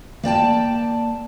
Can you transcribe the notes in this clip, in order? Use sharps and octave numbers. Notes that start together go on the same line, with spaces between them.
A#3 D5 G5 A5